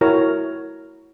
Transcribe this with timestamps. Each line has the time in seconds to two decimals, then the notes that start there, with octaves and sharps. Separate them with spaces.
0.01 E4 F#4 A#4 C#5 A#5